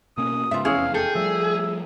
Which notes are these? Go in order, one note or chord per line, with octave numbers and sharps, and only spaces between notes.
B2 A#3 C#4 D#6
G#2 C#3 B3 F4 E5
F1 E2 E3 C#4 E4 G#4 F5
G#4 A4 G5
F3 G3 A3 E5